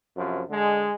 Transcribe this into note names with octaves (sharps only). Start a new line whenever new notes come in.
F#2 C3 F3
D3 G#3